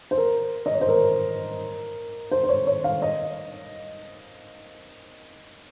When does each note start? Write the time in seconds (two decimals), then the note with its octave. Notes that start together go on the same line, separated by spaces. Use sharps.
0.11 C5
0.18 A#4
0.66 D#5
0.74 C#5
0.81 C5
0.88 A#4
2.31 C5
2.43 C5
2.49 C#5
2.67 C#5
2.84 F5
3.02 D#5